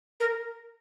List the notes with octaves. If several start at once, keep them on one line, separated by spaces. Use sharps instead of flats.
A#4